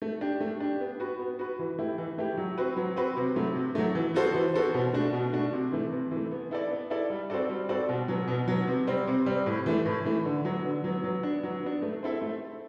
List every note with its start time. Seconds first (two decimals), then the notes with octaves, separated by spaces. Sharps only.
0.02 A3
0.21 D4 G4
0.40 A3
0.60 D4 G4
0.80 B3
1.00 F#4 B4
1.19 B3
1.39 F#4 B4
1.59 E3
1.78 A3 E4 G4
1.98 E3
2.18 A3 E4 G4
2.37 F#3
2.58 C4 F#4 B4
2.77 F#3
2.96 C4 F#4 B4
3.17 C3
3.36 F#3 A3
3.55 C3
3.75 F#3 A3
3.95 E3
4.14 B3 F#4 A4 C5
4.34 E3
4.54 B3 F#4 A4 C5
4.74 B2
4.93 A3 D4 F#4
5.13 B2
5.33 A3 D4 F#4
5.53 C3
5.72 E3 A3
5.92 C3
6.11 E3 A3
6.31 B3
6.51 E4 A4 D5
6.70 B3
6.90 E4 A4 D5
7.10 G3
7.30 C4 F#4 A4 D5
7.49 G3
7.69 C4 F#4 A4 D5
7.89 B2
8.08 F#3 B3
8.28 B2
8.48 F#3 B3
8.67 C3
8.87 G3 C4
9.07 C3
9.26 G3 C4
9.46 A2
9.66 E3 A3
9.85 A2
10.05 E3 A3
10.25 D3
10.45 F#3 B3
10.64 D3
10.84 F#3 B3
11.04 F#3
11.23 B3 D4
11.43 F#3
11.63 B3 D4
11.82 A3
12.03 C4 E4 A4 E5
12.22 A3